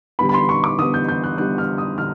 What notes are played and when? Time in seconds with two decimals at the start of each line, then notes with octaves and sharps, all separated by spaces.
0.19 D3 G3 B3 B5
0.29 B5
0.34 C6
0.49 C#6
0.64 D6
0.79 D3 G3 B3 D#6
0.94 G6
1.09 G6
1.24 F#6
1.38 D3 G3 B3 F#6
1.58 F6
1.78 D#6
1.98 D3 F6